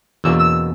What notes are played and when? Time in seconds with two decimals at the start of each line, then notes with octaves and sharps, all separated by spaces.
0.24 E2 B2 A#3 C#4 E6
0.39 E6